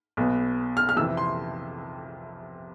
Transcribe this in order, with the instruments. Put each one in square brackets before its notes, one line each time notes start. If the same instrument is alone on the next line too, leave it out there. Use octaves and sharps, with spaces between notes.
[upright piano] B1 B2 B3
F6
F6
F2 C3 E3 E6
C6